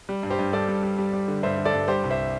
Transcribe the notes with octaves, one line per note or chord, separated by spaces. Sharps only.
G3
G2
G4 C5
G2
G2 A4 D5
G3
G3
G3
G3
D3
G2 C5 E5
D3
A4 D5
G2
G3 G4 C5
C2
C5 E5